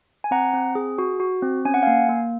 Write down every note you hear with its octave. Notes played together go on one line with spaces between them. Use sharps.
G#5
C4 F#5 A#5
C4
G#4
F#4
F#4
C4
C#4 G#5
F#5
A#3 F5 G#5
A#3